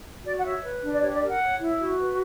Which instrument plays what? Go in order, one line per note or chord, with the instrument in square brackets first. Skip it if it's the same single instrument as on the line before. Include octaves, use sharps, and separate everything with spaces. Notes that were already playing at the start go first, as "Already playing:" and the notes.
[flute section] F#4 D5
F#5
C#5 E5
B4
D4
D5
G4 C#5
D5
A#4
F#5
C#5
E4
F#4
B4